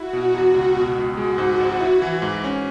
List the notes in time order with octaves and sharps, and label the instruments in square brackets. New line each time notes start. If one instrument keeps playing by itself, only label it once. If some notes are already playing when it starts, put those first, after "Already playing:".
Already playing: [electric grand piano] E4 [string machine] F#4
[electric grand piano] B2
E2
C#2
B2
C#2
[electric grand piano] G#3 [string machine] F#4
[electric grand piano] G#2
G#1
E4
E3
G#2
C#4